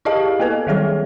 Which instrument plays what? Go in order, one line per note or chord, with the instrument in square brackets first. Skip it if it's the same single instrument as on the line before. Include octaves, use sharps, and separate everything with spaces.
[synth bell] E4 G4 G#4 D#5 F5 A5
A#3 B3 A4 B4 G#5
D#3 F#3 G3 G#4 C#5